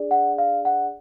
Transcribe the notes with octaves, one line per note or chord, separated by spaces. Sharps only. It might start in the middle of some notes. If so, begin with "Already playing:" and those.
Already playing: D4 G#4 D5
F#5
F5
F#5